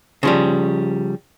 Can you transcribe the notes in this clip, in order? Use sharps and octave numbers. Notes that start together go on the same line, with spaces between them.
C#3 F3 G3